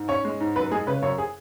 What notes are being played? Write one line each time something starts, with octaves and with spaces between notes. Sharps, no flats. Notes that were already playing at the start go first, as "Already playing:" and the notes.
Already playing: G#2
C#4 C#5
G#3
G#2
F#2 B4
G#3 G#4
C#3 B4
F#2 C#5
G#4